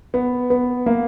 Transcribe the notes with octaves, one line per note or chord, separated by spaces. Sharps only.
B3
B3
A#3